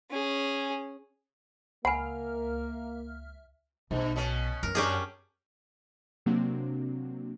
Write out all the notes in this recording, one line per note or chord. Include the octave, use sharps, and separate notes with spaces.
C#4 G#4
C#2 A#3 E5 F#5 G#5 B5 F6
B1 G2
B2 C#4
F#2 A#4
B2 F#3 C#4 D4 G4 G#4
C3 F#3 A#3 C4 D4 F#4